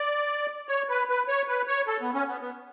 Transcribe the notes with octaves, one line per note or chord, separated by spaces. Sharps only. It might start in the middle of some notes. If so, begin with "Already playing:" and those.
Already playing: D5
C#5
B4
B4
C#5
B4
C#5
A4
B3
C#4
B3
B3